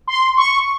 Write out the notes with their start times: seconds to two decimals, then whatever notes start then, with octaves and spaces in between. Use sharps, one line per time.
0.07 C6
0.37 C#6